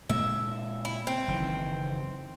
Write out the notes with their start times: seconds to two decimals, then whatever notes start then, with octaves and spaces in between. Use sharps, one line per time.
0.09 A#2 G#3 A#3 E5
0.85 E4
1.07 C4
1.28 F#1 D#3 E3